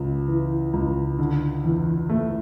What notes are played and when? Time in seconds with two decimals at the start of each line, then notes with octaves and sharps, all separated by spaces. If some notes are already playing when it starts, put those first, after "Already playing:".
Already playing: C#2
0.28 E3
0.73 C#2
1.19 D3
1.64 E2
2.10 A3